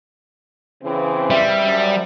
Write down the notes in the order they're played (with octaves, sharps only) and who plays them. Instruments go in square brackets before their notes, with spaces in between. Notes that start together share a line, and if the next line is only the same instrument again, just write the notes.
[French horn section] C#3 E3 C4
[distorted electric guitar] G3 [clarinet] E5
[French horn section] F#2 C5 D5